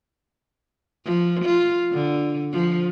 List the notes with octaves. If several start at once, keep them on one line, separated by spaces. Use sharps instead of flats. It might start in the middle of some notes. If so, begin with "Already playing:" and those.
F3
F4
D3
F3